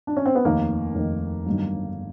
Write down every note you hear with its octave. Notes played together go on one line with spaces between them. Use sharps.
D4
C#4
C4
B3
F1 D#2 D#3 A#3
F1 D#2 D#3
G1 G2 D#3 F#3